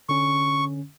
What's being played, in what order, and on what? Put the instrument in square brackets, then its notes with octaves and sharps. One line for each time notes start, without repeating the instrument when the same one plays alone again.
[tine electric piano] D3 C#4 [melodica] C#6